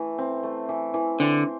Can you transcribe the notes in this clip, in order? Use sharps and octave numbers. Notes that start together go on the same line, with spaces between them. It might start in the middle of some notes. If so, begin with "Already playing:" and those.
Already playing: E3 A3
C4
A3
E3
E3
D3 C4